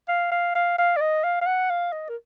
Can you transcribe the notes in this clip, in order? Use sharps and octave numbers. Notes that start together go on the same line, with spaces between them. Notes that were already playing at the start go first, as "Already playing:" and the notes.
F5
F5
F5
F5
D5
D#5
F5
F5
F#5
F5
D#5
A#4